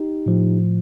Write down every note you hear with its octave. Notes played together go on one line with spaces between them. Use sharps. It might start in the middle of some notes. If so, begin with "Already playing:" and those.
Already playing: D#4 G4
A2 F3